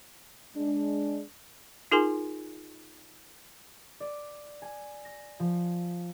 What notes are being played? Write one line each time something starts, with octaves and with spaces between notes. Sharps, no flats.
G#3 D4
D#4 F4 G#4 A#4 G#5 C6
D5
G#5
A#6
F3